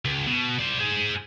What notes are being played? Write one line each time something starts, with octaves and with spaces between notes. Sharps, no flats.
C#2
B2
C5 D5
G#4 C5